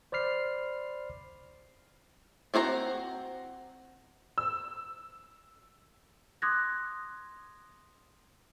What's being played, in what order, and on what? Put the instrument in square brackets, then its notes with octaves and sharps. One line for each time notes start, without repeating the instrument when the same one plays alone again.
[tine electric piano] C5 D5 B5 F6 C7
[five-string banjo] C4 F#4 C5 A#5
[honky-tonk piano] E6
[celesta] C6 D6 D#6 F#6 G#6 A#6